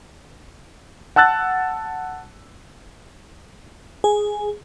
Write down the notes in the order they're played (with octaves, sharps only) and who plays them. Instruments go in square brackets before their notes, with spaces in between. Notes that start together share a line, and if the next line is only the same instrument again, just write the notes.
[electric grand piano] F#5 A5 E6 F#6 A6
[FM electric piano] G#4